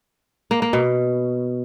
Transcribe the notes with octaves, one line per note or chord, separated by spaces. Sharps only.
A#3
A#3
B2